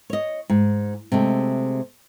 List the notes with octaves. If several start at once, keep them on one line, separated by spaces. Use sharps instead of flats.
C#5 D#5
G#2
C3 G#3 A3